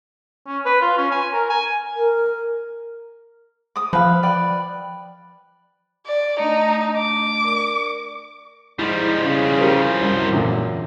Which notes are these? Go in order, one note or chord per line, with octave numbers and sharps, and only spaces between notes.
C#4
B4
F4
C#4
G#5
A#4
G#5
A#4
D6 D#6
F3 B4 F5
B4 D5 G5
D5
A3 D4 D#4
D6
A#4 D5
G#2 F3 G3 E4
C#3
G4 A#4 C5
C2 F#2
E2 A#2 D3